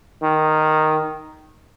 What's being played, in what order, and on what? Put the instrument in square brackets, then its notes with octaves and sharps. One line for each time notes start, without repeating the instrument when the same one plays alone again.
[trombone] D#3